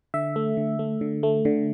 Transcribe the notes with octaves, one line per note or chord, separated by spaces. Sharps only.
D3 E5
A3
D3
A3
D3
A3
D3